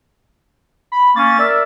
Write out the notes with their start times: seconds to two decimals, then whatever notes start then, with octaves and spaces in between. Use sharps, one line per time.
0.92 B5
1.16 A#3 C#4 A6
1.38 A#4 D5 E5